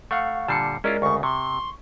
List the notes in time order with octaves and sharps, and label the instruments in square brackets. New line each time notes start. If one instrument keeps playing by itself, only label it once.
[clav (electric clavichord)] A3 [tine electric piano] F5 F#5 C#6
[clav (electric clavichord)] A#2 D3 G3 [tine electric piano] A5 C7 C#7
[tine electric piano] G#3 A#4 D5 [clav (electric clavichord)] C#4 E4 F4
[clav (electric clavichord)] D2 C#3 [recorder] C#6
[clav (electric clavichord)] C3 [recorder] C6 [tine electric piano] C#6